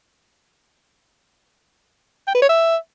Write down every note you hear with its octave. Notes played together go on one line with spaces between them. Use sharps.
G5
B4
C#5
E5